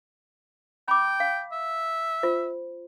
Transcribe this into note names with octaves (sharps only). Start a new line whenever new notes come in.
G5 B5 D6
F5
E5
F4 C5